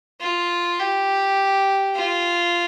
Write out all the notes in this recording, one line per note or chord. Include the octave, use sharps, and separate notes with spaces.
F4
G4
F4